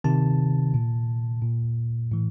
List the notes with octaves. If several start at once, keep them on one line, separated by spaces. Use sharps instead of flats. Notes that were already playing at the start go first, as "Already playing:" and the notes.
C3 D#3 A5
A#2
A#2
A2 E3